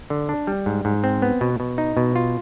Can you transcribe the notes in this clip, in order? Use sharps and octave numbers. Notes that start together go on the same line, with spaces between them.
D3
D4
G3
G#2
G#2
C4
B3
B2
B2
D#4
B2
F4